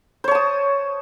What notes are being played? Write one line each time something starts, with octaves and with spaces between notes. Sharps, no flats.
C5 C#5 A5 D#6